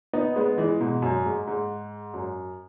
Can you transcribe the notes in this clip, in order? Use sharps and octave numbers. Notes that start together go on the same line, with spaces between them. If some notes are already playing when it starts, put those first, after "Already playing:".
B3 D#4
G#3 B3
E3 G#3
G#2 B2
F#2
G#2
G#2
F#2